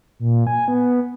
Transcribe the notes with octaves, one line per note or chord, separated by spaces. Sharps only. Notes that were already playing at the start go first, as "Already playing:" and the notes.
A#2
G#5
B3